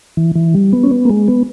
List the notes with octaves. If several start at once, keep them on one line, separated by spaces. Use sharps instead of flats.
E3
E3
G3
B3
C#4
B3
A#3
G#3
B3